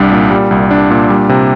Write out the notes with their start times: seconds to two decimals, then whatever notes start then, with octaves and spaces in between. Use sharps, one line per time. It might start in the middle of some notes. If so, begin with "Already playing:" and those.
Already playing: C2 G3 D4
0.12 A#2
0.31 G3
0.51 C2
0.71 D4
0.91 A#2
1.10 G3
1.29 C3